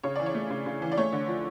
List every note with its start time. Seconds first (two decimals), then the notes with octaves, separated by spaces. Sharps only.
0.03 C#3 C#5
0.15 E3 D5
0.26 C#5
0.34 A3
0.50 C#3
0.66 C#3
0.82 E3
0.92 D5
0.97 A3 C#5
1.13 D3
1.28 F3